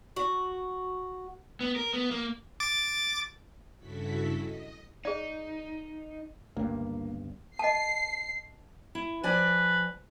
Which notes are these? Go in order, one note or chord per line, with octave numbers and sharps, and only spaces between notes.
F#4
B3
A#4
B3
A#3
D6 A6
G2 C#3 E4 F#4 A4 B6
D#5
D#4 G#4 D5
G1 C#2 G2 A#3
D#5 A5 C7
E4
F3 B4 D5 G#5